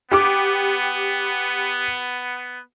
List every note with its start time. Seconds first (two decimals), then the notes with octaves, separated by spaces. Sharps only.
0.12 B3 G4 D6